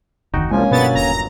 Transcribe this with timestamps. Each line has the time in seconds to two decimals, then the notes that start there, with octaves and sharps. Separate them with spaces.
0.34 F1 D2 D#3 D#4 F#4 G5
0.51 C2 F3 G3 G#3 A#3 C#4 G#5
0.71 G1 B2 F#3 B3 A6
0.95 D#1 A#5